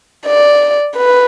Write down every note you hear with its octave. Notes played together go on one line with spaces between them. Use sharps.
D5
B4